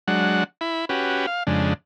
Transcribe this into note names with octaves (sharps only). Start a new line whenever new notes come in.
F#3 G#3 D4 F#5
E4 B5
C#4 F#4 G4 B4
F5
F2 C#3 G#3 D4